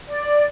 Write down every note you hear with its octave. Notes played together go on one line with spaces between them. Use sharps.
D5